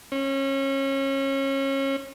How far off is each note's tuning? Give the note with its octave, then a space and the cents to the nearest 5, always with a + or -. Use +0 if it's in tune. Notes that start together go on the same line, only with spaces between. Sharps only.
C#4 -30